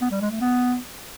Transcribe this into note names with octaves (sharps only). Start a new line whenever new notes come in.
B3
G3
G#3
A3
B3